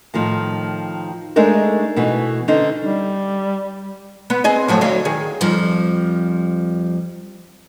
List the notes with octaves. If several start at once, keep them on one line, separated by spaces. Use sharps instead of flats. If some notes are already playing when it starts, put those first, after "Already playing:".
A2 D#3 F3
G#3 A3 D4 D#4 A#4
B2 E3 A3 B3
D3 C#4 D#4 C5
G3
B3
C4 G#4 D#5
A2 F3 F#3
D2 F#3 F5
D#3 G#4
F2 F3 G3